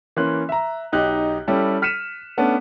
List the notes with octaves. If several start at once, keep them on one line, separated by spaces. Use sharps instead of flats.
E3 A#3 C#4 C6 F#6
E5 A#5
B1 D#4 G4 F#6
G3 C#4 E4 G4 A4
F6 B6 C#7 D#7 E7
A3 B3 C#4 D4